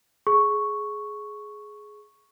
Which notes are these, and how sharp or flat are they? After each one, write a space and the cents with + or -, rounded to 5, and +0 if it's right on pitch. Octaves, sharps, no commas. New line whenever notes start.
G#4 +15 C#6 +0